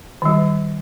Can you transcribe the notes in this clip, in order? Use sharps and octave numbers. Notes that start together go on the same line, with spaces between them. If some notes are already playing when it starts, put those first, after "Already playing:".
D#3 G3